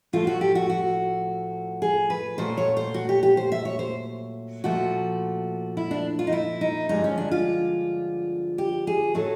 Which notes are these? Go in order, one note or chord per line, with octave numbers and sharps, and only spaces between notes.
A2 F3 A3 F4
F#4
G4
F#4
F#4
G#4
B4
A#2 F#3 A3 C5
C#5
C5
F#4
G4
G4
C5
E5
C#5
C5
A#2 F3 A3 F#4
E4
D4
F4
D#4
E4
D#4
G2 D3 F3 G#3 D#4
C#4
D4
F4
G4
G#4
A2 F#3 A3 A4